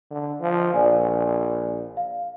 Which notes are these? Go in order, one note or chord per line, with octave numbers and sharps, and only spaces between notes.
D3
F3
A#1 D5 G#5
F5